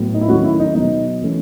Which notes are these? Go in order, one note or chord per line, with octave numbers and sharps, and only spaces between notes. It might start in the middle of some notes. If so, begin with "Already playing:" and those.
Already playing: A2 F#3 B3
D#4
E4
D#3 F#3 A3 C#4 F#4
E4
D#4
B2 F#3 B3 D#4
E3 A3 C#4